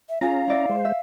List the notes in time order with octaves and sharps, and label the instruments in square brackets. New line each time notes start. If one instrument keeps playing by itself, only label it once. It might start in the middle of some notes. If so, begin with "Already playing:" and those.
[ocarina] E5
[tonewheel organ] C#4 A#5 [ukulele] F4 G#4 [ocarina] F5
[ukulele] E4 D5 E5
[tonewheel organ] G#3 C5
[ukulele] E5